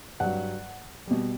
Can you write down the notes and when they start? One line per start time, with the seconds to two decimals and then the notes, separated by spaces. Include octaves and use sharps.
0.20 G2 F#3 F#5
1.07 B2 G3